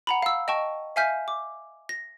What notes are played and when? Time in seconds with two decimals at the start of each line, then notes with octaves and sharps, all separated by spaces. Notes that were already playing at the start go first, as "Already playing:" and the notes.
0.07 F#5 A#5 B5
0.23 F5 E6
0.48 D#5 G5 A5 C#6
0.96 E5 F5 G#5 F6 G6 B6
1.28 D6
1.89 A#6